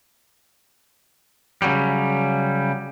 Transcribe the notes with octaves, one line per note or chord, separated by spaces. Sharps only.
C#3 F#3 G3